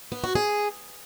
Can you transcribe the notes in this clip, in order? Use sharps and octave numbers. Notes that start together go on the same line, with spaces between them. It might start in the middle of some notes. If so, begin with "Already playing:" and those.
B3
F#4
G#4